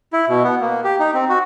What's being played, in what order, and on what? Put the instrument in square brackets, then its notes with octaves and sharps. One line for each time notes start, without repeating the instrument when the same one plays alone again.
[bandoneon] E4
B2
B3
A#3
G4
D#4
C4
F#4